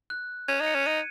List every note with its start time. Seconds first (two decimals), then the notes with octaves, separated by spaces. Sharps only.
0.10 F#6
0.48 C#4 G#6
0.61 D#4
0.67 C#7
0.75 C#4
0.80 C#7
0.86 D#4 D#7